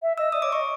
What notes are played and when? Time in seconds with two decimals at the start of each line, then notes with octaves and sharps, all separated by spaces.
0.02 E5
0.18 D#5 E6
0.32 D5 D#6
0.42 C#5 D6
0.52 D#5 C#6